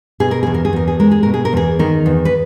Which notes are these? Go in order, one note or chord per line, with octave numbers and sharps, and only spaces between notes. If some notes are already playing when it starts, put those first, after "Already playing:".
B2 G#4
A#4
E2 G#4
A#4
G#4
E2 A#4
G#4
G#3 A#4
G#4
B2 A#4
G#4
A#4
E2 G#4
D#3 A#4
E2
B4